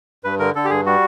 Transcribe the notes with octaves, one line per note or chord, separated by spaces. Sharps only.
G2 B4
D3 A#4
D3 A4
G4
G2 G#4
G3 F#4